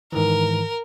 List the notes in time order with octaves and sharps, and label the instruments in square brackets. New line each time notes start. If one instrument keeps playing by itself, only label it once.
[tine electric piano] G#2 D#3 E3 [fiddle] A#4